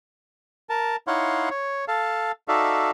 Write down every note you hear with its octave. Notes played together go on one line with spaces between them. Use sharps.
A#4 A5
D#4 E4 C#5 F5 F#5 C6
C#5
A4 F5 A5
D#4 F#4 A4 D5 E5 F5